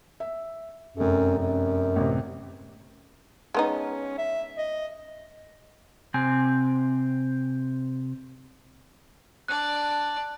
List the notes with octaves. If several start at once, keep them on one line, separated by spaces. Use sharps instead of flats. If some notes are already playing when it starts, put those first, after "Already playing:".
E5
F1 F#2 A4
F#2
A1 C3
G#3 B3 C#4 D#4
E5
D#5
C3 C4 G#5
D4 D5 F#6